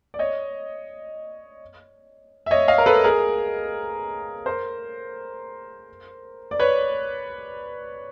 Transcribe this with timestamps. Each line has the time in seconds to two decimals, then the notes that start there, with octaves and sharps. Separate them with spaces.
0.14 D5
0.19 C#5 D#5
2.46 E5
2.51 C#5 D#5
2.68 D#5 F5
2.78 A#4
2.86 A4 B4
3.04 G#4 A#4
4.46 A#4 C5
6.51 D5
6.59 B4 C#5